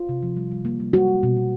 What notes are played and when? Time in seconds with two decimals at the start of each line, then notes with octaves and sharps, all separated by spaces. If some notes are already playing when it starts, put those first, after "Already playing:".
Already playing: F4
0.09 C3
0.23 F3
0.36 G3
0.51 G3
0.65 A#3
0.80 G3
0.93 G3 F#4
1.08 G3
1.23 B2
1.37 B2